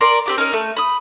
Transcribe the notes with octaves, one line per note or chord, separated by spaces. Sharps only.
A#4 D5 C6
C4 G4 D6
C#4 D#4 A#4
A3
B5 D#6